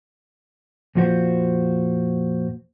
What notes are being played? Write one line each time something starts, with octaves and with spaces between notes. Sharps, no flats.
F2 A#2 F3 F#4 C5